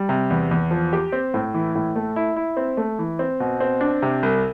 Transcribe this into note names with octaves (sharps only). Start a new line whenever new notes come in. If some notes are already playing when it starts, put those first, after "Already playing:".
Already playing: G3
C3
E2
E2
F3
G4
C4
A2
E3
A2
A3
E4
E4
C4
A3
E3
C4
B2
C4
D4
C3
C2